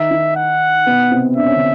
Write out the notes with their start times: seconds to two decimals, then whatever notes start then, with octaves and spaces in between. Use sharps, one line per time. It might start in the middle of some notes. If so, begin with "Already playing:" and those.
Already playing: D#3 D#4 E5
0.11 D#3 D#4
0.36 F#5
0.87 B2 B3
1.11 C3 C4
1.36 D4 E5
1.46 C#4
1.56 D3 D4